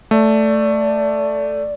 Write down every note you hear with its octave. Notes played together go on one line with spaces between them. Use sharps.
A3 D5